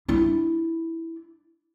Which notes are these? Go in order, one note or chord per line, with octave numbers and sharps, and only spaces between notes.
D4 E4